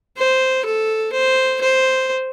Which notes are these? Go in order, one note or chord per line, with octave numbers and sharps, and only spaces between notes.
C5
A4
C5
C5